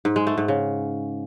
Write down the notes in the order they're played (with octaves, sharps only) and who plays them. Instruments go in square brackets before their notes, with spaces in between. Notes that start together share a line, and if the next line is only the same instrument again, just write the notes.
[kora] G#2
G#3
A3
G#2
C#3